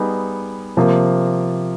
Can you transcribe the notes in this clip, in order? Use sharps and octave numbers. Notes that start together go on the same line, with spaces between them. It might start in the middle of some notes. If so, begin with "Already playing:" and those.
Already playing: G3 B3 D#4 G#4
C3 F3 A#3